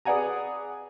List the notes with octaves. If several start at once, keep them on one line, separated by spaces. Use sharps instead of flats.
G#4 B4 D5 F#5 G#5 A#5